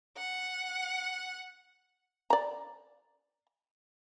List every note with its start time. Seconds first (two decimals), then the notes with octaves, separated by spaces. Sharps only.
0.18 F#5
2.30 D5 A#5